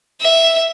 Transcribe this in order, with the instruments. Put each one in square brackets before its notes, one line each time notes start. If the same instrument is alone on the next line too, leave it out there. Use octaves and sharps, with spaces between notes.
[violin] E5